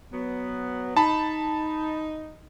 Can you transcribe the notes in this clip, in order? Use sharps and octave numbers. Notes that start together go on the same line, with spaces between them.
F#3 B3
D#4 A5 B5